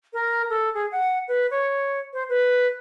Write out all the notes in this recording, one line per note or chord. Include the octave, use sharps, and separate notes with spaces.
A#4
A4
G#4
F#5
B4
C#5
C5
B4